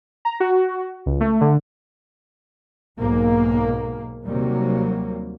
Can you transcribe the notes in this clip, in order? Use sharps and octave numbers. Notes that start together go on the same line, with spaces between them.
A#5
F#4
C#2
A3
D3
B1 G#2 B2 A#3
D#2 C3 F#3 G3 A#3